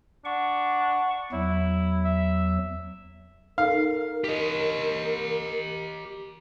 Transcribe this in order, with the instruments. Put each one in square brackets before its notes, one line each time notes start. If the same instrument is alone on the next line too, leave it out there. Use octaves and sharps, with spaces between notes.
[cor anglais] D4 [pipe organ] F#5 C#6
[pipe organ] E2 F#3 [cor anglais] E4
[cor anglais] E5
[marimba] D#4 A4 [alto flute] A#4 [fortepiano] F5
[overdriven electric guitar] G4 D#5